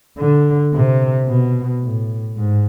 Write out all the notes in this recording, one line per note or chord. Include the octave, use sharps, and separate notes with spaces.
D3
C3
B2
A2
G#2